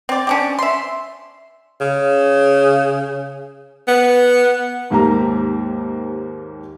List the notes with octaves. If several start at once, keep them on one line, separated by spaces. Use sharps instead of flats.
C4 D5
C#4 D4 G4
E5 C6
C#3
B3
D#2 G#2 A#3 G4 A#5